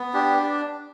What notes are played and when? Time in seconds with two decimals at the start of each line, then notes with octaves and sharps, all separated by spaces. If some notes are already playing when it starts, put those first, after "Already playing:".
Already playing: B3
0.14 D4 G4